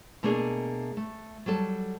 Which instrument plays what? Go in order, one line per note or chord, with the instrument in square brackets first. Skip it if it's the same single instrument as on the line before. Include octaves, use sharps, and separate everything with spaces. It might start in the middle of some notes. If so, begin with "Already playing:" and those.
[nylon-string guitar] B2 A3 A#3 D4 G#4
A3
F#3 G3 A4 A5